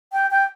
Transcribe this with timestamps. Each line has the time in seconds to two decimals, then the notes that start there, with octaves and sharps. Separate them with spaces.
0.13 G5
0.31 G5